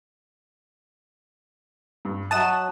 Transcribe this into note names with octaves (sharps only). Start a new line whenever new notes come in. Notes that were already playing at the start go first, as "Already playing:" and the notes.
G2
F#3 D#5 E5 F#5 A5 D#6 E7